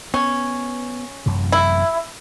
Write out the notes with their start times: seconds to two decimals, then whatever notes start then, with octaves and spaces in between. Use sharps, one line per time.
0.14 B3 C#4
1.26 A1 F#2 C3
1.52 E4